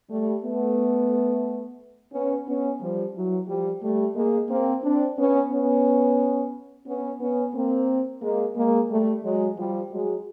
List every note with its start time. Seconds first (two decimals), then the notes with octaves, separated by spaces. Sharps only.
0.10 G3 A3
0.44 A3 B3
2.13 B3 C#4
2.47 B3 C#4
2.81 F3 G3
3.14 E3 F#3
3.48 F3 G3
3.82 G3 A3
4.16 G#3 A#3
4.50 A#3 C4
4.83 C4 D4
5.18 B3 C#4
5.51 B3 C#4
6.86 B3 C#4
7.20 B3 C#4
7.54 A#3 C4
8.22 G#3 A#3
8.56 G#3 A#3
8.89 G3 A3
9.23 F#3 G#3
9.57 F3 G3
9.91 F#3 G#3